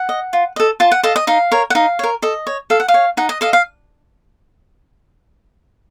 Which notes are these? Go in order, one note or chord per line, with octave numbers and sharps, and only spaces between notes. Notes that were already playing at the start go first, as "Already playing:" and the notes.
Already playing: F#5
D#5
F4
A4 D#5
F4 A5
F#5
A4 D#5 F5
D#5
D#4 F5
A#4 C#5
F#5
D#4 F5
A#4 C#5
A4 D#5
C#5
A4 F5
F#5
F5
C#5
D#4 F#5
D#5
A4 D#5 F5
F5